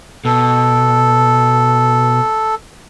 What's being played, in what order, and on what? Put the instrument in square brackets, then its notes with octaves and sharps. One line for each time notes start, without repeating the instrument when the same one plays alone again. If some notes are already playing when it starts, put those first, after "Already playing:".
[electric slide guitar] B2 [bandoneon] A4